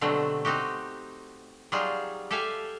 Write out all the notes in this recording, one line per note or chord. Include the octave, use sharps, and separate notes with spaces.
B2 D3 F#3 G3 A3 C4
C4 D#4 F#4 G4
F#3 G3 D#4 F4 G#4
G4 A4 E5 F5 G#5